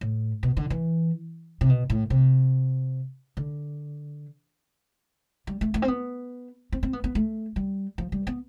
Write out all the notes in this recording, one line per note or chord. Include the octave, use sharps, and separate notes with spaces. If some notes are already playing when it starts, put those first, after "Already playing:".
A2
B2
D3
E3
C3
B2
A2
C3
D3
G3
A3
A3
C4
B3
C4
C4
B3
B3
A3
G3
F3
G3
B3